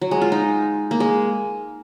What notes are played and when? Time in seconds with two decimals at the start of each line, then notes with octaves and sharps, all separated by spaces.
0.02 F#3
0.11 G#3
0.21 F4
0.32 D#4
0.91 A#3
1.00 G#3